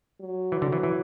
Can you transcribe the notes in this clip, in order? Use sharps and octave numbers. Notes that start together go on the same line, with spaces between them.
F#3
E3
D3
E3
E3